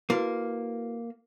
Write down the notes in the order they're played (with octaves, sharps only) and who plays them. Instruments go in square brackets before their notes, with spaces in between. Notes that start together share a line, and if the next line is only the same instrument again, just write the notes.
[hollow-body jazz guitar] A#3 [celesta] E4 F#4 B4